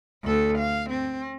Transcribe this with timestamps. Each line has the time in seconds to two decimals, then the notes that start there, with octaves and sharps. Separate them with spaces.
0.24 D2 A4
0.58 F5
0.90 C4